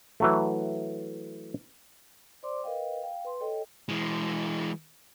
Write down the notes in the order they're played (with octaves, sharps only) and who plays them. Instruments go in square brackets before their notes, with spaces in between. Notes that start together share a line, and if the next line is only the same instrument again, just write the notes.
[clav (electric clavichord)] E3 F#3 A3
[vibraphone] C5 D5 C6 D6
A#4 B4 D#5 F5 G5
F5 G5
B4 C6
A4 C#5 D#5 G5
[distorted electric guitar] E3 G#3